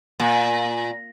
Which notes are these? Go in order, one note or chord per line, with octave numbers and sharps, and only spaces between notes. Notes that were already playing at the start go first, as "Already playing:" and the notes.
A#2